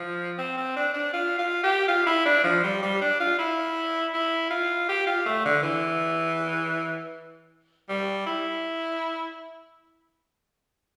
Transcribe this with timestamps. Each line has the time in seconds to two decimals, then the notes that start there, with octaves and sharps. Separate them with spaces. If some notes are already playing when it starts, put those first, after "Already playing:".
Already playing: F3
0.38 C4
0.57 C4
0.76 D4
0.94 D4
1.13 F4
1.39 F4
1.64 G4
1.88 F4
2.07 E4
2.26 D4
2.44 F3
2.63 G3
2.83 G3
3.01 D4
3.20 F4
3.39 E4
4.14 E4
4.50 F4
4.89 G4
5.07 F4
5.26 A3
5.45 D3
5.63 E3
7.89 G3
8.26 E4